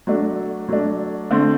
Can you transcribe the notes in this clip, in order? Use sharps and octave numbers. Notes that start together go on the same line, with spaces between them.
F#3 A3 D4
F#3 A3 D4
D3 A3 C4